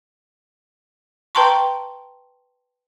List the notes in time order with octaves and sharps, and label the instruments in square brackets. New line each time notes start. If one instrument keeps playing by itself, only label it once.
[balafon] B4 G5 A5 A#5 C6 C#6